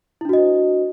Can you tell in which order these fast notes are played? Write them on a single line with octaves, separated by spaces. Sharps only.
E4 D4 F#4 D#5 C5